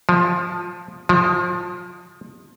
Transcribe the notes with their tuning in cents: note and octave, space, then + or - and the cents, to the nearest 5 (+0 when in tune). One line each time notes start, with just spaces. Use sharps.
F3 +15
F3 +25